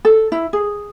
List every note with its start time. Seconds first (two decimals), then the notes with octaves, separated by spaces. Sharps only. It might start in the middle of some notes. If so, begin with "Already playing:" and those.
0.05 A4
0.32 E4
0.53 G#4